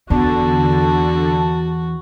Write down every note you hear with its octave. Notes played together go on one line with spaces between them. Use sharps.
E2 D3 F#4 A5